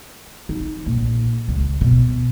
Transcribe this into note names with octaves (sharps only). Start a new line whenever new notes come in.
D#4
A#1
C#2
B2